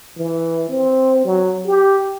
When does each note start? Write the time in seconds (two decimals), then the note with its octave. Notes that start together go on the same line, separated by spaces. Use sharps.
0.17 E3
0.69 C4
1.25 F#3
1.66 G4